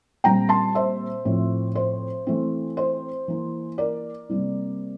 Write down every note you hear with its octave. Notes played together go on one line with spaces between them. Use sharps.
A#2 G3 C4 G5 A#5
A5 C6
C5 E5
A2 F3 C4
C5
E3 A3 C4
C5
E3 A#3
A#4 D5
C3 G3 A#3